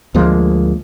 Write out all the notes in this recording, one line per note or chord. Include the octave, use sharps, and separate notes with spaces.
D2 F3 G#3 A#3